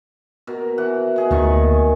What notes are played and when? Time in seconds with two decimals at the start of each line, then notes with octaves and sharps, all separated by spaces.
0.47 B2 A#4
0.78 E3 F#5
1.16 B2 G#4 D#5
1.31 D2 A#2 D#3 C#6